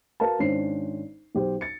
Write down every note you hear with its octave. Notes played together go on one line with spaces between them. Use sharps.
F#4 A#4 B4 F5 A5
G#1 C#4 D4 C5 C7
B1 G4 C5
A6 C#7